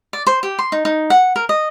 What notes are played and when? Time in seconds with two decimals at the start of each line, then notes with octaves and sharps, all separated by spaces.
0.13 D5
0.27 C5
0.43 G4
0.59 C6
0.72 D#4
0.85 D#4
1.10 F#5
1.36 A#4
1.49 D#5